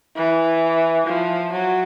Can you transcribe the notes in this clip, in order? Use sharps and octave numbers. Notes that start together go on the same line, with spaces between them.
E3
F3
F#3